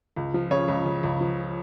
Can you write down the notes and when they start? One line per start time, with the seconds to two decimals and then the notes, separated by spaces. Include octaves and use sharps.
0.16 C#2
0.34 F3
0.51 C#3 C#5
0.68 C#2
0.86 C#3
1.03 C#2
1.21 F3